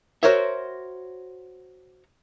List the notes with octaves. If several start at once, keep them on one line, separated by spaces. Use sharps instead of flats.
F#4 A#4 C5 C#5 E5